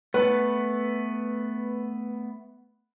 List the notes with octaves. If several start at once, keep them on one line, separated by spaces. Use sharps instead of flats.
A3 B3 B4